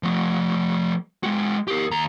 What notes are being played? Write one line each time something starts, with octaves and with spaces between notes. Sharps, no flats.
F3 A3
G#3 F#4
G4 A#4
D#2 A#5